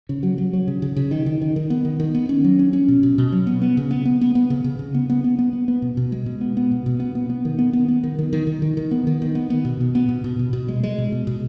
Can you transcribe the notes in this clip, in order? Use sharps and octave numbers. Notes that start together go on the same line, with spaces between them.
C#3
F#3
F#3
F#3
C#3
C#3
C#3
D#3
D#3
D#3
D#3
B3
D#3
D#3
B3
C#4
F#3
C#4
C#4
B2
B2
B2
F#3
B3
B3
C#3
B3
B3
B3
B3
C#3
C#3
C#3
B3
B3
B3
B3
B3
B3
B2
B2
G#3
B2
B3
B3
B2
B2
B3
B3
B3
D#3
B3
B3
B3
D#3
D#3
D#3
D#3
D#3
D#3
B3
D#3
D#3
B3
B3
B2
B2
B3
B2
B2
B2
B2
G#3
G#3
B2
B2
B2